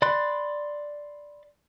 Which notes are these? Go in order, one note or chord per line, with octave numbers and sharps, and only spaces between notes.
D5 B5 C6 F#6